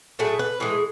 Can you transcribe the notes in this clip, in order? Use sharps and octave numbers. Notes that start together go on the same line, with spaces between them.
A2 F#3 A3 G#4
B4
A2 E3 G#3 G#4